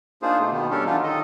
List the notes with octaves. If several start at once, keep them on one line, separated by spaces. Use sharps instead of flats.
A#3 D4 D#4 F4 G#4 C5
B2 A3
B2 D#3 B3
G3 C#4 D4 G4 A4 A#4
E3 F#3 D4 D#4 F4
D#3 A4 D#5